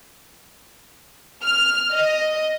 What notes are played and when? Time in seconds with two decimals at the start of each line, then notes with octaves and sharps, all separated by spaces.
1.44 F6
1.92 D#5